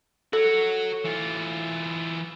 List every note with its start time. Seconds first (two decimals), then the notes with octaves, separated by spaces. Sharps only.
0.33 F#4 A4 C#5
1.04 E3 F4